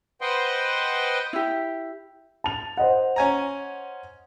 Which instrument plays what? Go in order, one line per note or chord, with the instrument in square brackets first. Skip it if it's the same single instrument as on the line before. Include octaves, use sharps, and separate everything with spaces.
[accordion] B4 C5 D#5 F#5 G5 C6
[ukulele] E4 G4
[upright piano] A5 F7
C5 D#5 F#5
[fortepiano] C#4 G#5 A#5